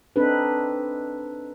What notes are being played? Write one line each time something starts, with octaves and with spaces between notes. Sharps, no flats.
C4 D4 D#4 A4 B4